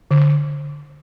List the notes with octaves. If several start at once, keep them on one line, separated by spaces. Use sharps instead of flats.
D3